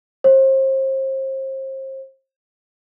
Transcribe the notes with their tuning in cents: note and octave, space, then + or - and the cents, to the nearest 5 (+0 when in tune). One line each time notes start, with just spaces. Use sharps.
C5 +35